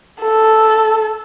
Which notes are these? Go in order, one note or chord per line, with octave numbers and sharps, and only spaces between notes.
A4